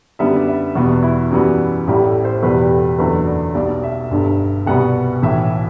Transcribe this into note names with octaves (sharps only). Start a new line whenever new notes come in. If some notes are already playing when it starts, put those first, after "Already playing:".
F#2 D3 G3 B3 E5
D5
E5
E2 B2 G3 B3 D5
E4
F#2 E3 G3 B3 F#4
A1 A2 G3 G4
A4
C5
A4
E2 B2 G3 B4
G4
A4
F#1 E2 D3 F#3 A3 B4
D5
B1 B2 G3 D5
E5
G1 G2 D3
C2 B2 G3 B3 F#5
B1 A2 E3 E5